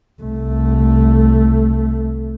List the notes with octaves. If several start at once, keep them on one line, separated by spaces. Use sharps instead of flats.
C2 A3